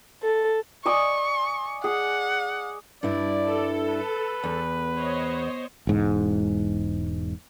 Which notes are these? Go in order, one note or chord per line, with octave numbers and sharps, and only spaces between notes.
A4
D5 D#5 G#5 C#6
G#4 F#5
G2 D4 E4 D5
A4
B4
E2
C5 C#5 D#5
E1 G#2